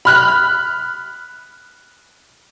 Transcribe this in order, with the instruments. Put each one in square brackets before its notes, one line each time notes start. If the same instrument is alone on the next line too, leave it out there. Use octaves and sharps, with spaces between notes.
[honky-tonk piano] B5 F6 F#6